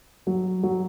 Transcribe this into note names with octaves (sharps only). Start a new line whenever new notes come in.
F#3
F#3